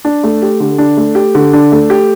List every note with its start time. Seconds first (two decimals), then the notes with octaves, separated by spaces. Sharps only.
0.05 D4
0.23 A3
0.42 G4
0.60 D3
0.78 D4
0.97 A3
1.15 G4
1.35 D3
1.53 D4
1.72 A3
1.90 G4